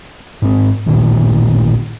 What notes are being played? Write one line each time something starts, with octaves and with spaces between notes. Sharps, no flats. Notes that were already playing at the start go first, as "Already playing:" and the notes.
G#2 C4
A1 A#2 D#3